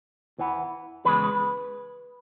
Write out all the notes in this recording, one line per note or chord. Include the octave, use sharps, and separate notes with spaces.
E2 E3 B3
E2 C#3 G#3 B4